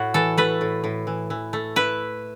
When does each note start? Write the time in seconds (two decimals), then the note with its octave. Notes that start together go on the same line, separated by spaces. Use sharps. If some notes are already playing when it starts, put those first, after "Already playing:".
Already playing: A2 F#4
0.14 E3 A4
0.38 A3 B4
0.61 A2
0.84 A2
1.07 E3
1.30 E3
1.53 A3
1.76 E4 B4